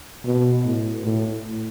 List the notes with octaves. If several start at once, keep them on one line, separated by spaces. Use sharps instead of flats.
B2
A2
A2